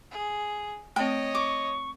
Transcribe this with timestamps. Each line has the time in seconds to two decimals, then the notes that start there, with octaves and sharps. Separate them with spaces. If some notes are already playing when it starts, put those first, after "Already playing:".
0.11 G#4
0.96 A3 C4 C#5 D#5 G5
1.35 C#6 D6